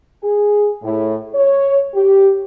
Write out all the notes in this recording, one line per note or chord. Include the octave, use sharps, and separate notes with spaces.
G#4
A2
C#5
G4